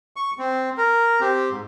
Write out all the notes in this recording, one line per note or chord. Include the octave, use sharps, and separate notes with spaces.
C#6
C4
A#4
C4 G4
G#2